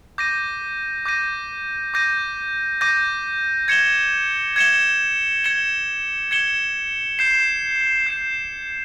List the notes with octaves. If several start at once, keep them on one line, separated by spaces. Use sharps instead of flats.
D6 G6 A#6 D#7
D6 G6 A#6 D#7
D6 G6 A#6 D#7
D6 G6 A#6 D#7
G#6 C#7 E7 G7
G#6 C#7 E7 G7
G#6 C#7 E7 G7
G#6 C#7 E7 G7
G6 C7 E7
G6 C7 E7